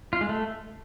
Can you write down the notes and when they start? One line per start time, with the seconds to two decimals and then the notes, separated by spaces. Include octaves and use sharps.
0.13 F4
0.21 G#3
0.29 A3